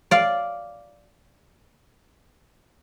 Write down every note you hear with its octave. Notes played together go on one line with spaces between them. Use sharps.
D5 F5